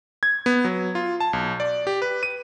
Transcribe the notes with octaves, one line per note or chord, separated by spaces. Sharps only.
G#6
B3
F#3
F4
A5
B1
D5
G4
B4
D#7